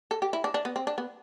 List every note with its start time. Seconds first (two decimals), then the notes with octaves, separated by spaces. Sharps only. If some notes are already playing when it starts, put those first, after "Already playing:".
0.11 A4
0.22 G4
0.33 E4
0.44 D4
0.54 D4
0.65 B3
0.76 C4
0.87 D4
0.98 B3